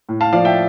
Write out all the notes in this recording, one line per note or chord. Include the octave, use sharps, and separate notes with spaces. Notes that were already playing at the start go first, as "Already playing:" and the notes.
A2
F5 A5
F3 D5 F5
E5 G5